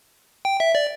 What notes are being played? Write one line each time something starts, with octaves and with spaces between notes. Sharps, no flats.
G5
E5
D5